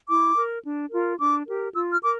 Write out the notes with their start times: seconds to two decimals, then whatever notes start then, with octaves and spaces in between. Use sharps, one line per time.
0.09 E4 D6
0.36 A#4
0.63 D4
0.91 F4 A#4
1.19 D4 D6
1.46 G4 A#4
1.73 F4 E6
1.92 F6
2.01 A#4 D6